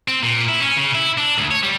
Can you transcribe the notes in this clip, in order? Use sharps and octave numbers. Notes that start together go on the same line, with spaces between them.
C4
A#2
E4
C#4
C#3
E4
D4
D2
C#5
G3